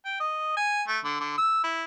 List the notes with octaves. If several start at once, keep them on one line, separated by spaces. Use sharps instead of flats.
G5
D#5
G#5
A3
D3
D3
E6
E4